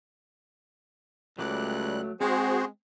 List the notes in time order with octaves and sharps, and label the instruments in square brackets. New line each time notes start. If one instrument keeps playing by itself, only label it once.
[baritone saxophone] C#2 [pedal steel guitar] F#3 A3 D6 [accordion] G3 F#6
[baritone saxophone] G#3 [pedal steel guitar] C4 [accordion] F#4 G#4 C5